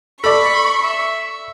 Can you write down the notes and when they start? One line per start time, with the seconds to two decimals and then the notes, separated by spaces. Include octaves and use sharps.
0.24 A4 D5 B5 C#6
0.83 E5